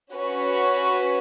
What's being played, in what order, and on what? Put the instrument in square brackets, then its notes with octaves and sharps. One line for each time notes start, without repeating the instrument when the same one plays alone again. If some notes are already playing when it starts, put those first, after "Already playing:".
[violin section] C#4 F#4 B4